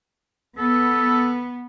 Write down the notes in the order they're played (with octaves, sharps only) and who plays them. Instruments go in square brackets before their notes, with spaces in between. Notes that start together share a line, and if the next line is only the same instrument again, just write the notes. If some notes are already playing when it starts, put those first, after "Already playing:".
[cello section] B3 [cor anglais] A4